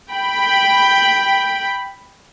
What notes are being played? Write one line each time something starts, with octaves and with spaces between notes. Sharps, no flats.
G5 B5